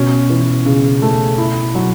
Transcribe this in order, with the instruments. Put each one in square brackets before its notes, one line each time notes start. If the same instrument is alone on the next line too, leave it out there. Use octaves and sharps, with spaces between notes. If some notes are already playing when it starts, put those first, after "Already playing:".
Already playing: [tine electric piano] B2 [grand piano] C#4
[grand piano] E3
C#3
A3
E4
F#3